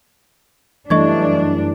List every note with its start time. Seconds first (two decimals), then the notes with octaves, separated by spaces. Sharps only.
0.90 F#2 E3 G3 A3 D4 D#5 C#6 G#6